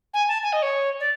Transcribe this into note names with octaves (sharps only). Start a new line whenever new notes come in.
G#5
A5
G#5
D#5
C#5
D5